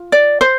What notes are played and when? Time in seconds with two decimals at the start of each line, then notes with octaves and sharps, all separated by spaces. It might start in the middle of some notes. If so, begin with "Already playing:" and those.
Already playing: F4
0.12 D5
0.41 C5